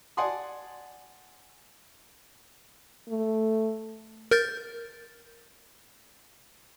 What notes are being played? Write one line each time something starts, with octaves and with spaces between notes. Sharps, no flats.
D5 F#5 G#5 A5 C6 D#6
A3
A#4 G6 A6